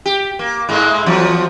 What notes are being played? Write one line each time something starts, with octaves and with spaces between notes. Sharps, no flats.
G4
A#3
G#2 G#3 A#3
E2 F3 F#3